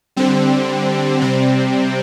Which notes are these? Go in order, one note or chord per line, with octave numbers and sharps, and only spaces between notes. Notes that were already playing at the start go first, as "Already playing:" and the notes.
D3 G3 C4
C3 G3 C4